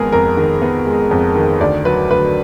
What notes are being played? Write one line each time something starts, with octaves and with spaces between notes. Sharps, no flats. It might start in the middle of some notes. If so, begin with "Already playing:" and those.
Already playing: F2 D#3 G#3 B3 G#4 A#4
F2 A#4
D#3
B3
G#3
F2
D#3
D2 D5
F#3 B4
D2 B4